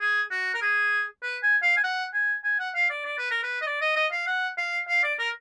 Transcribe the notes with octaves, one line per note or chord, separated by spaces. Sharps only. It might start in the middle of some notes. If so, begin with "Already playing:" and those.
G#4
F#4
A#4
G#4
B4
G#5
F5
G#5
F#5
G#5
G#5
F#5
F5
D5
D5
B4
A#4
B4
D#5
D5
D#5
D#5
F5
F#5
F5
F5
D5
A#4